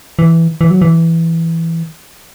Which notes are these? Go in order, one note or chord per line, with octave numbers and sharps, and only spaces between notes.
E3
E3
F#3
E3